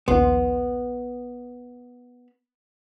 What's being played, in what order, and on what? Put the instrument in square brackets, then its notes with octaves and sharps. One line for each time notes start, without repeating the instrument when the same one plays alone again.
[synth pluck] A#1 D#2 C6 [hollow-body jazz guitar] B3